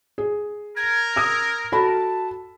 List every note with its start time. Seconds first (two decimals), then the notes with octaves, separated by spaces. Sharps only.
0.18 G#4
0.76 A#4 G#6
1.16 D#6 E6
1.72 F#4 A4 A5 B5